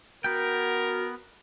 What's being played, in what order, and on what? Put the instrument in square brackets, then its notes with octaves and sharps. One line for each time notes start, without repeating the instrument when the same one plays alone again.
[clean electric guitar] B3 G5 [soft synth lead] F#4 [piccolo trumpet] A#4